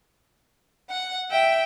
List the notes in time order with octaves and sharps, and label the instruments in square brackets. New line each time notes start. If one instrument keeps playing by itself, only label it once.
[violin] F#5
[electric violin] E5 [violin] G5